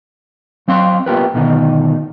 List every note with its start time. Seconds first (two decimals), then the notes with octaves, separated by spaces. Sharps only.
0.68 F#3 C4 F5 C6
1.06 A#3 B3 F4 G4 A#4 B4
1.34 D2 B2 D#3 D#4